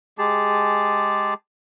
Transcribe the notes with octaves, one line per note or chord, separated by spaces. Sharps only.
G#3 G4 G#4 A5